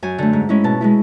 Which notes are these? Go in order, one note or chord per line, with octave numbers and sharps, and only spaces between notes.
F#2 G#5
D3 A3
G#2
G#3 C#4 E4
B2 A5
G#3 C#4 E4